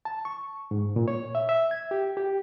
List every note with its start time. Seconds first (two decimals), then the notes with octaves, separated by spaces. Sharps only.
0.05 A5
0.25 C#6
0.71 G#2
0.96 A#2
1.08 C#5
1.35 E5
1.49 E5
1.71 G#6
1.91 G4
2.17 G4